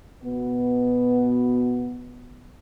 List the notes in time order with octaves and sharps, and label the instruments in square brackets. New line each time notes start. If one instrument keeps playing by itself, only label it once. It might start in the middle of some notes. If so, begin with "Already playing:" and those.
[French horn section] B2 B3